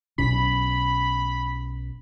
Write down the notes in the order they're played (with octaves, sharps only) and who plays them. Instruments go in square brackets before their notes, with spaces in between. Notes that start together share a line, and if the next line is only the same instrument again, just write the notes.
[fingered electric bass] B1 B2 C#4 [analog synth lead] B5